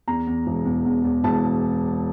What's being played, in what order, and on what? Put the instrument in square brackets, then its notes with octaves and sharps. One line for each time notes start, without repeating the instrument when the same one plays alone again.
[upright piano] E2 A#5
E2
E1
E2
E2
E2
E1 A5